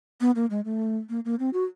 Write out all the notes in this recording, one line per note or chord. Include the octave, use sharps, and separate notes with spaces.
B3
A#3
G#3
A3
A#3
A#3
C4
F#4